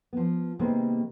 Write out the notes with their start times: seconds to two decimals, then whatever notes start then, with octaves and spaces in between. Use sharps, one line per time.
0.13 F3 B3
0.59 C3 D#3 G3 G#3 A#3 B3